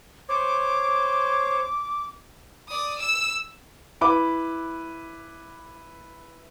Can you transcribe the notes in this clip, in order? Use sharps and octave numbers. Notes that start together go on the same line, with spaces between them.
C5 C#5 D6
D5 D#6
E6 E7
E4 B4 D6